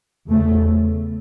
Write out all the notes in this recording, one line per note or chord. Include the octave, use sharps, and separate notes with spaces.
E2 C#3 A3